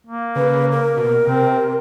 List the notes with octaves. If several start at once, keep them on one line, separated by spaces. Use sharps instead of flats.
A#3
C#3 B4
A#4
B2
C3 C4